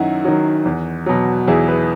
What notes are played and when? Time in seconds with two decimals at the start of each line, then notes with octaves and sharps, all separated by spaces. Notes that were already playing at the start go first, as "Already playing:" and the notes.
Already playing: F#2 D#3 F#3 D#4 E4 F#4
0.25 D#3 F#3
0.66 E2
1.06 B2 F#3
1.47 E2 E4 G#4
1.68 G#4 B4